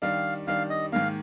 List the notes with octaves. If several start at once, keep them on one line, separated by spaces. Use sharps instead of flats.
D#3 G3 D4 F5
D#3 G3 D4 F5
D#5
G#2 D#3 A#3 F5